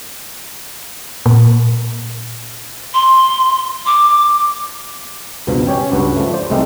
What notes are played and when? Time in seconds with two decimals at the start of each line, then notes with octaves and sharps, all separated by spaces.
1.26 A#2
2.94 C6
3.87 D6
5.47 C#2 G2 B2 F3
5.67 C#4 G4 C#5 G5
5.92 C#2 G2 F#4 B4
6.17 F3 A3
6.33 C5 D5
6.50 C2 G#3 A3 C4 D#4 G5